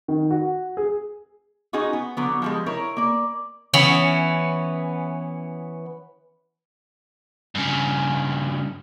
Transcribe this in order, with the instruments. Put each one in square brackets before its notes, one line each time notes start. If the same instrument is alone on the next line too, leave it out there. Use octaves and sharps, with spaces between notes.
[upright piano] D#3
F#4
G#4
[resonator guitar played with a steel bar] C#4 D#4 F4 F#4 G#4
B3
D3 F#3 B3
F3 G3 G#3
E4 A#4 C#5
A#3 D5
[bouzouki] E3 B3 C#4
[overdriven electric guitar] G2 C#3